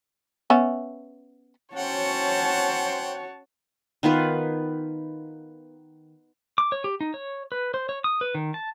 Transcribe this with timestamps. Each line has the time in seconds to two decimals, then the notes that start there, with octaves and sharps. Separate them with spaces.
0.50 B3 C#4 E5
1.76 C#4 F#4 C5 C#5 F#5 G5 A5
4.03 D#3 B3 F4 B4
6.58 D6
6.72 C#5
6.84 G4
7.01 D#4
7.14 C#5
7.52 B4
7.74 C5
7.89 C#5
8.04 D#6
8.21 B4
8.35 D#3
8.54 A5